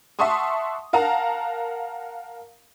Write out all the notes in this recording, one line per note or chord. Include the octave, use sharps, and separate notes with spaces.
E5 F#5 A5 C6 C#6 D#6
A#4 F5 F#5 A5 A#5